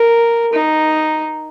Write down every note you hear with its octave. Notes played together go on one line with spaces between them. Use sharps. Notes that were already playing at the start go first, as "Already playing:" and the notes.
Already playing: A#4
D#4